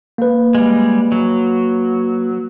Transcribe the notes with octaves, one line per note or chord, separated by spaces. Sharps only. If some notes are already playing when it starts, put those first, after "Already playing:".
A#3 B4
G3 G#3
F#3